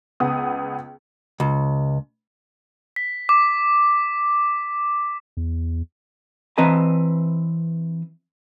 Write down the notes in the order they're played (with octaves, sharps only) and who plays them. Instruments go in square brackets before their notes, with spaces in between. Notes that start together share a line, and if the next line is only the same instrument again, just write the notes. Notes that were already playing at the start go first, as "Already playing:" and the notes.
[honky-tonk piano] C#2 B3 D#6
[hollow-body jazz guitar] C#2
[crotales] B6
D6
[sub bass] E2
[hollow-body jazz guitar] E3 C4 B4 D#5 A5 A#5